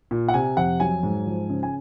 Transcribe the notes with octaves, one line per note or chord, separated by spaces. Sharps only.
A#2
F#5
C3 G#5
F2 F#5
F#3 G#5
G#2
F3
C#3
G#5